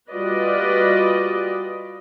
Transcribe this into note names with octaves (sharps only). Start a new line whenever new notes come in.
G3 F4 F#4 B4 D5 D#5